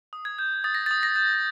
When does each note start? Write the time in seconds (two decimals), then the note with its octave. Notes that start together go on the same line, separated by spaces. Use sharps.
0.13 D#6
0.25 G#6
0.39 G6
0.64 D#6 A6
0.75 A#6
0.86 D#6 A6
1.03 A#6
1.16 G6